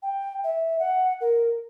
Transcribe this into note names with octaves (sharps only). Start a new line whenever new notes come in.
G5
E5
F#5
A#4